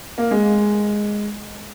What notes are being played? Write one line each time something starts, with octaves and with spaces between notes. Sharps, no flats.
A#3
G#3